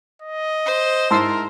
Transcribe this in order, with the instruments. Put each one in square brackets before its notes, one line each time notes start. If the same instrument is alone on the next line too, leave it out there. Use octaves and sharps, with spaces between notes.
[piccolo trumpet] D#5
[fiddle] C5
[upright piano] G#2 E4 [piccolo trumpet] A#4 [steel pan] A5 C6 E6